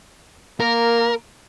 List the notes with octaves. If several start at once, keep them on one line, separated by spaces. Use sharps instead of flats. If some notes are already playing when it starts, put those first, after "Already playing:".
A#3 A#4